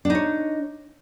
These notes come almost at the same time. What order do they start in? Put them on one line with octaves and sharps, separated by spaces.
D4 D#4 C#5